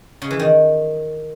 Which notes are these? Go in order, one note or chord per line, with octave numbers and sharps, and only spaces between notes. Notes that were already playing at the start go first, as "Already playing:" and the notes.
C#3
E3
D#3